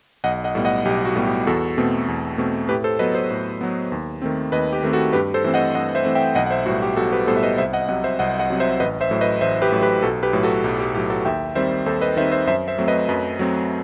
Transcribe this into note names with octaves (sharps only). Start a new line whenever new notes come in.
B1 D#5 F#5
D#5 F#5
A2 G3 B3
D#5 F#5
B1 G4
F#4
A2 G3 B3
G4
E2 F#4 A4
B2 A3 C4
E2
B2 A3 C4
A2 G4 B4
A4 C5
F#3 B3 B4 D#5
A4 C5
A2
F#3 B3
D#2
D#3 A3 C4
D#2 B4 D#5
G4
D#3 A3 C4
F#4 A4
G2 G4 B4
A4 C5
E3 A3 C4
D#5 F#5
G2 D#5 F#5
C5 E5
E3 A3 C4
E5 G5
B1 D#5 F#5
F#5
C5 E5
A2 G3 B3 F#4
G4
B1 F#4 A4
G4 B4
A2 G3 B3 A4 C5
E5
B4 D#5
C2 C5 E5
D#5 F#5
C3 F#3 D#5 F#5
C5 E5
C2 D#5 F#5
D#5 F#5
C3 F#3
C5 E5
A1 B4 D#5
C5 E5
A2 F#3
B4 D#5
A1 C5 E5
G4 B4
A2 F#3
G4 B4
B1 F#4 A4
G4 B4
A2 F#3
F#4 A4
B1 G4
G4
A2 F#3 G4
F#4 A4
D#2 E5 G5
D#3 G3 C4 C5 E5
D#2 A4 C5
B4 D#5
D#3 G3 C4 C5 E5
C5 E5
F#2 C5 E5
C5 E5
F#3 A3 C4
B4 D#5
F#2 B4 D#5
F#3 A3 C4